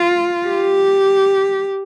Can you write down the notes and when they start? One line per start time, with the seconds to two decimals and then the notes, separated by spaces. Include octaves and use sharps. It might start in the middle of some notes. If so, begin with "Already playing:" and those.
Already playing: F4
0.47 G4